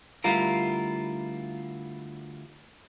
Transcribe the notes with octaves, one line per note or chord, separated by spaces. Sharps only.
D2 G3 E4 F4 A#4